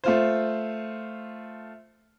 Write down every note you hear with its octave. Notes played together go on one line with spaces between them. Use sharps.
A3 F4 C5